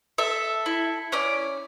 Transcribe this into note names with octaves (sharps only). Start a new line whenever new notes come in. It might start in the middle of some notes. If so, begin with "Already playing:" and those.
A4 E5
E4
C#4 D5